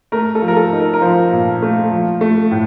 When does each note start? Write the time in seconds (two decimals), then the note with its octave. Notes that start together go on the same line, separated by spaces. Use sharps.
0.12 A3 A#4
0.35 A4
0.42 F3
0.48 A#4
0.57 A4
0.72 D#4
0.80 A#4
0.94 A#4
1.02 F3 C5
1.32 A#2
1.62 A3
1.91 F3
2.21 A3
2.51 A2